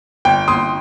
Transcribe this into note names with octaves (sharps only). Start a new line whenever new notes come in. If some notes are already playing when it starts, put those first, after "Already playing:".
G1 G5
G1 C6 D#6